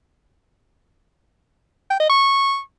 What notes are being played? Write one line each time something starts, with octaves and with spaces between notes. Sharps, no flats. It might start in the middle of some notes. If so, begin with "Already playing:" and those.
G5
D#5
C#6